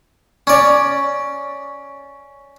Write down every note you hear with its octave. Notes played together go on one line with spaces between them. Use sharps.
C#4 D5